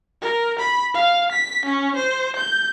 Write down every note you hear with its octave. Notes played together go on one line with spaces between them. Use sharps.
A#4
B5
F5
B6
C#4
C5
G6